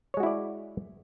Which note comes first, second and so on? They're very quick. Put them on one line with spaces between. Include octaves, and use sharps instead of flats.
C#5 G#3 F#4 E4 D5